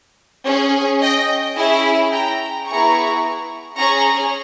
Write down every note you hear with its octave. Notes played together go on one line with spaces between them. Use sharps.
C#4 G#4
D#5 G5
C#4 E4 G#4 E5 G#5
G5 A#5
B3 E4 G#4 A#5 C#6
C#4 G#4 A#5 C#6